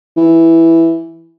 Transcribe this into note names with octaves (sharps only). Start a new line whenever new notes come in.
E3